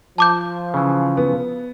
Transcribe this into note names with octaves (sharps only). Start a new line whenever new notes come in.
F3 A5 D6 G6
C#3 E3
B3